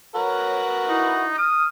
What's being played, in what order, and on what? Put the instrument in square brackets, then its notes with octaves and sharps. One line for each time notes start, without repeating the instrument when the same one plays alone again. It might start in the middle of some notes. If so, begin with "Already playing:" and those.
[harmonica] F#4 A#4 B4 [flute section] C#5
[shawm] D#4 [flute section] E4
[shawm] D#6 [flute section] F6